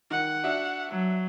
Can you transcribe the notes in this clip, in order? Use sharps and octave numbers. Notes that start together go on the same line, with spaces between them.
D#3 F#5
D4 F#4 E5
F#3